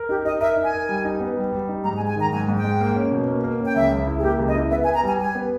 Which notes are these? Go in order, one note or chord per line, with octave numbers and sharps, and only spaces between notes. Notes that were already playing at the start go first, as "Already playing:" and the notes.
Already playing: A#4
D#4 G4
D#4 D#5
A#4 E5
D#4
G#5
A#4
G3
D#4
B3
G3
G3
D#4
G#2 A#5
G#5
G#3
G#5
D#3 A#5
G#2 G#5
G#2
G5
G#3
A#3
C#4
B2
A#3
A#3
C#4 G5
C#2 E5
C#2
E4
G#4
A#3 G4
C#2
D#5
E4
B3 E5
G#5
B3
A#5
G3 G#5
G3 G#5
B3